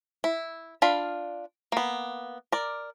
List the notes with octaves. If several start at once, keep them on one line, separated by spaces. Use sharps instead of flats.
E4
D4 F4 F5 B5
A#3 B3
A#4 D5